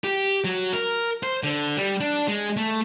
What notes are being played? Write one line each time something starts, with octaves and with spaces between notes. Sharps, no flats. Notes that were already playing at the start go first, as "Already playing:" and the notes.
G4
F#3
A#4
C5
D3
G3
D4
G#3
A3